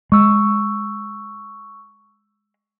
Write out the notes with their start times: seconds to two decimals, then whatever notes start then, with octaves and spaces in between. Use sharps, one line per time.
0.12 G#3 C#6 E6